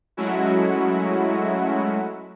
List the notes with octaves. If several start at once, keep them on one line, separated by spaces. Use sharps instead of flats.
F#3 G#3 A3 C#4 E4 F#4